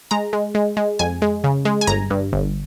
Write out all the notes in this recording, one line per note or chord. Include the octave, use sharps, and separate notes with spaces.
G#3 A#5
G#3
G#3
G#3
F2 G#5
G#3
C#3
G#3
G#5
G1 A#5
G2
G1